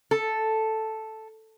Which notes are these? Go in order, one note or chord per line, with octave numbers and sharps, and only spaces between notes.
A4